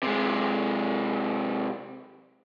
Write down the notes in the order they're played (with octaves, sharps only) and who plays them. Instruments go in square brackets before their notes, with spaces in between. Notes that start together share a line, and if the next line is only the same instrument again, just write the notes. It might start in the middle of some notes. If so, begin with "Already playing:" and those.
[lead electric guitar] C3 G#3